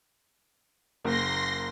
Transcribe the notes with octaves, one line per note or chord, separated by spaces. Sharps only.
F#1 A#3 C6 A#6